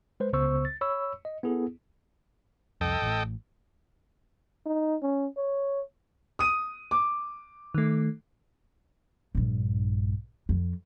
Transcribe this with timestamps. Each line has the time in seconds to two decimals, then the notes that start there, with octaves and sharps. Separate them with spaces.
0.20 G#3 B4 C5
0.33 C#2 C#3 B3 C5 C#6 E6
0.65 A6
0.81 C#5 B5 C#6 E6
1.25 D#5
1.43 B3 E4 G#4 A4
2.81 C2 F2 A4 D#5 G5
3.02 A1 A2
4.66 D#4
5.02 C#4
5.37 C#5
6.39 D#6 D#7
6.91 D6
7.74 D#3 A3
9.35 A#1 G2
10.49 F2